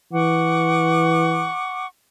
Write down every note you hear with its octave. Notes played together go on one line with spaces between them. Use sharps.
E3 F#5 C#6 D6